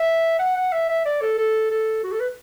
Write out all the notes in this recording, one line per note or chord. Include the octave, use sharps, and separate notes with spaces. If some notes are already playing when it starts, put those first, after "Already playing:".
Already playing: E5
F#5
F#5
E5
E5
D5
A4
A4
A4
F#4
A4
B4